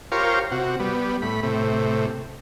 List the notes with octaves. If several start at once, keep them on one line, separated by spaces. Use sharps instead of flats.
F4 G4 A#4 C5 C#5 F5
C3 F#4
G3 B3
A2 B5
A2 C3